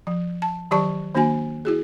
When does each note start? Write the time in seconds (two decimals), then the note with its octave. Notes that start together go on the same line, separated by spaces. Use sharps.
0.07 F3
0.42 A5
0.71 D#3 F#3 G4 D5 A5 C#6
1.14 D#3 A#3 D4 F#4 G#5
1.65 E4 F#4 G#4